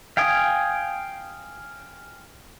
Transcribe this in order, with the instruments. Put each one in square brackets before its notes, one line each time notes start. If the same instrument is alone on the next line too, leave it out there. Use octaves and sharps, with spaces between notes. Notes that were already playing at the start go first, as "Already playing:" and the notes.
[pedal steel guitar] F5 G5 G#5 D#6